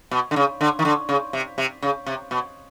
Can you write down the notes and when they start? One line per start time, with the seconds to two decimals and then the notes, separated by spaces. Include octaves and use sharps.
0.11 B2
0.31 D3
0.36 C#3
0.61 D3
0.79 D#3
0.85 D3
1.09 C#3
1.33 C3
1.58 C3
1.82 C#3
2.06 C3
2.31 B2